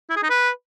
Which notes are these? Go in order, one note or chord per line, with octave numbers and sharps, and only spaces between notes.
E4
G#4
D#4
B4